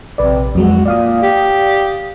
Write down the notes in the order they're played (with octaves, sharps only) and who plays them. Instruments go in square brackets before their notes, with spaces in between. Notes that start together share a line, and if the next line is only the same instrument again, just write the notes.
[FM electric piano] A#1 B4 D5 [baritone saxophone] C3
[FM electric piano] F2 F#3 G#3 [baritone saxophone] F#4
[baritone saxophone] A#2 [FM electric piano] D5 F5 D#6
[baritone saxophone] G4